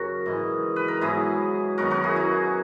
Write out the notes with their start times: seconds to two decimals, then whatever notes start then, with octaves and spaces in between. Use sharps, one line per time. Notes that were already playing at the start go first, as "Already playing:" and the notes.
Already playing: F#2 C#3 F#4 A#4
0.26 G#2 E3 G#3
0.76 B4
0.88 A#4
1.01 G#2 F#3 B3 E4 G#4
1.78 F#2 D#3 F#3 B3 F#4 A#4
1.91 F#4 A#4
2.04 E4 G#4
2.16 E4 G#4